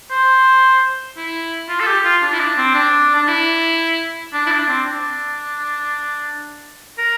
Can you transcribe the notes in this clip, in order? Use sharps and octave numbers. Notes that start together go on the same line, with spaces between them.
C5
E4
F4
A4
G4
F4
D4
E4
D4
C4
D4
D4
E4
D4
E4
D4
C4
D4
A#4